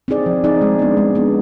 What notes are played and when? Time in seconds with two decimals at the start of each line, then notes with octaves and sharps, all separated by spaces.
0.08 C4 D#4 G#4 D5
0.26 F3
0.44 C4 D#4 G#4 D5
0.61 G#3
0.79 B3 D4
0.97 G#3
1.15 B3 D4